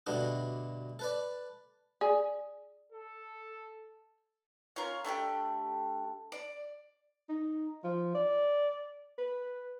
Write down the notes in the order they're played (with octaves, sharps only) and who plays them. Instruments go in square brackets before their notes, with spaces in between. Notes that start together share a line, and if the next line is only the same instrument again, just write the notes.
[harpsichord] D2 G2 B2 A3 B3 D4
A4 B4 D5
[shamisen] G#4 [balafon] D5
[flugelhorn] A4
[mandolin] C#4 F4 A#4
A3 D4 F4 G4
D5
[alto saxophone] D#4
F3
D5
B4